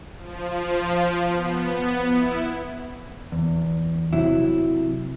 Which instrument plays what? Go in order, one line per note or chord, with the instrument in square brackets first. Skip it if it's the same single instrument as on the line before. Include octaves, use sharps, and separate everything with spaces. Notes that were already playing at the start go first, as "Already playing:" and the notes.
[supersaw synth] F3
B3
E4
[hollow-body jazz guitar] E2
C3 F#3 E4